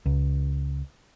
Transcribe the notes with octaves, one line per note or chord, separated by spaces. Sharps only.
C#2